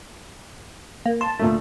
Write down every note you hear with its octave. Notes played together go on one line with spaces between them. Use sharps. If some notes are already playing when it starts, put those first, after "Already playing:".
A#3
A5 C6
D2 A#2 A3